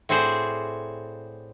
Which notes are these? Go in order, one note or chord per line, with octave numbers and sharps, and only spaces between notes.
A2 C4 F#4 G#4 C5 D5